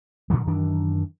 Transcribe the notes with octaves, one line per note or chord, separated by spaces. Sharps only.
A#2 D3 F3 F#3
F#2 D#3 E3 D4